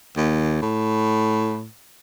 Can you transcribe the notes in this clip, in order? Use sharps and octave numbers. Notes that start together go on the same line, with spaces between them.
D#2
A2